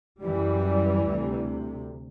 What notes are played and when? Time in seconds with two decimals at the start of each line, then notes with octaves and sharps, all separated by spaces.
0.22 F#2 E3 G3
1.03 D2 C3